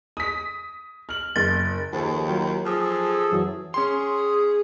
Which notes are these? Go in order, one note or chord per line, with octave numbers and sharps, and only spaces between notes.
D#6 B6
F6 F#7
F#1 A6
D#2 F3 G#4 A4
F#3 F4 G5
F3 G#4 A4
F#2 E3 F#3
C#4 G#4 C6